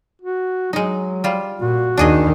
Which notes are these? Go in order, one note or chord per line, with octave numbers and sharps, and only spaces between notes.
F#4
F#3 G#3 D#4
G3 F4
A#2 F#4
D#2 D#3 D4 G#4 D#5